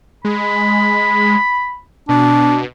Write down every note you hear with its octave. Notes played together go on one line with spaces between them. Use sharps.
G#3 B5
B2 D4